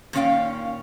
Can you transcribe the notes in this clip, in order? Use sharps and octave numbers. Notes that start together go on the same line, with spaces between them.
A#2 D#3 C#4 C#5 F5 G5